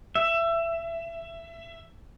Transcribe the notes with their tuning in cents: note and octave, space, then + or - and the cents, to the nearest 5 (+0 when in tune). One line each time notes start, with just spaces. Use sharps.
E5 +20